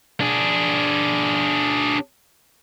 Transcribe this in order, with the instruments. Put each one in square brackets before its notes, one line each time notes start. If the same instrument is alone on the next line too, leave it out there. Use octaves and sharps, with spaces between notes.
[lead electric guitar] D4 G#4